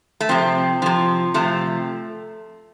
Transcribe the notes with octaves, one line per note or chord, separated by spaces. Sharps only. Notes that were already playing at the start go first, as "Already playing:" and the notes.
A3
C3 F3 C4
C3 F3
C3 F3 A3